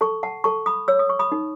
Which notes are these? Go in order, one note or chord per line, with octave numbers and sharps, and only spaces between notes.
A4 A5 C#6
F#5 A5
A4 A5 C#6
B5 D#6
C#5 E6
D#6
C#6
B5 D#6
D#4